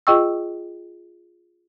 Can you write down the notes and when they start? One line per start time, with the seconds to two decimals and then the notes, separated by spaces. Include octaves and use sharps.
0.07 F4 G#4 D#5 G5 C#6 E6